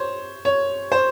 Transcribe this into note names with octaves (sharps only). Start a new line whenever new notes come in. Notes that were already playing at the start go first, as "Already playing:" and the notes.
Already playing: C5 C#5
C#5
C5